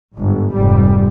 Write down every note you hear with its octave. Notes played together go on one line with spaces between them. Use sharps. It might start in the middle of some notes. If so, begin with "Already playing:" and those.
G1 G#2
F1 G#2 G3